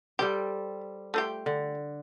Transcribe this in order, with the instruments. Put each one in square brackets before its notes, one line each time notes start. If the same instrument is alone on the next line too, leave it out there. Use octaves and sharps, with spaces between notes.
[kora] G3 A4 C5 [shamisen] G4
[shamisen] A3 F4 G4
[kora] D3